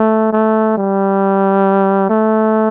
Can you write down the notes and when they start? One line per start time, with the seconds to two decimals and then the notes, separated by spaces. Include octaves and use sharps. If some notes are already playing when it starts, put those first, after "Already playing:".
Already playing: A3
0.33 A3
0.77 G3
2.09 A3